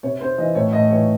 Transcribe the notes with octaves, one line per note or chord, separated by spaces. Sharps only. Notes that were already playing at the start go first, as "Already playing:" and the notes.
C3 C#5
C4 C5
E3 D#5
A2 C#5
A2 D#5
E3 C#5